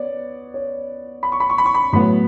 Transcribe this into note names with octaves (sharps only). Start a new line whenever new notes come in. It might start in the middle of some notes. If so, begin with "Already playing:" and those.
Already playing: B3 C#5 D5
C#5
B5
C#6
B5
C#6
B5
C#6
B5
A2 F#3 B3 B5